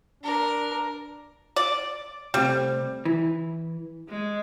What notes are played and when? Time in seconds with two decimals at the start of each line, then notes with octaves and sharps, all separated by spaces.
0.23 D4 A#4
1.56 D5
2.34 C3 G3 A3 C4
3.05 E3
4.09 G#3